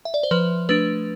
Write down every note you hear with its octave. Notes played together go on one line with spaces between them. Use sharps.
E5
D5
C5
F3 B4
A3 D4 B4